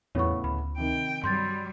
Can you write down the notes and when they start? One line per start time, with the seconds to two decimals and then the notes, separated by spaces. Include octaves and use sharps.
0.15 E2 A2 C#3 B3 C#5 C#6
0.44 D2 B5
0.78 C3 D#3 G5
1.24 G2 F#3 G3 C6 G6 A6